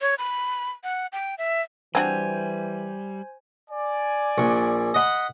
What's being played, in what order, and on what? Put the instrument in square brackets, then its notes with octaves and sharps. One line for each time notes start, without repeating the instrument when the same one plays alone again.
[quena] C#5
B5
F#5
G5
E5
[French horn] E3 [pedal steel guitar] G3 [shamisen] C4 D4 F#4 [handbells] C5 G#5 G#6
[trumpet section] D5 G#5
[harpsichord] A#1 C#6
D#5 F#5 B5